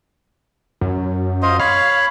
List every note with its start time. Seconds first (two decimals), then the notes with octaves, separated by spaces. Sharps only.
0.81 F#2
1.42 F4 C5 D#5
1.60 C#5 F5 B5